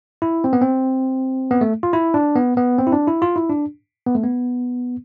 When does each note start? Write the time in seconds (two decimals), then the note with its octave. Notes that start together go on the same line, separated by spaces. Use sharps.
0.22 E4
0.44 C4
0.53 B3
0.61 C4
1.51 B3
1.61 A3
1.83 F4
1.93 E4
2.14 D4
2.36 B3
2.57 B3
2.78 C4
2.87 E4
2.92 D4
3.07 E4
3.22 F4
3.36 E4
3.50 D4
4.06 B3
4.15 A3
4.23 B3